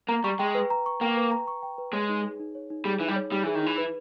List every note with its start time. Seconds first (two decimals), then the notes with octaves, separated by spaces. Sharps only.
0.09 A#3 A#5
0.24 G3 C#6
0.39 G#3 G5
0.55 B4
0.70 A#5
0.86 C#6
1.01 A#3 G5
1.17 B4
1.32 A#5
1.47 C#6
1.63 G5
1.78 B4
1.93 G#3 C#5
2.09 D#4
2.24 G#4
2.40 D#4
2.55 C#5
2.70 D#4
2.85 G3 G#4
3.00 E3 D#4
3.08 G3
3.16 C#5
3.32 G3 D#4
3.43 E3 G#4
3.55 D#3
3.63 E3 D#4
3.78 B4